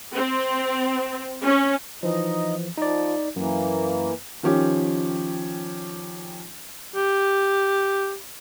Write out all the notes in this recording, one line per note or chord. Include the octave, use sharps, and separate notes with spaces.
C4
C#4
E3 F3 D#4 D#5
F3 D#4 D5
F#2 E3 A#3
D#3 F3 C#4 G4
G4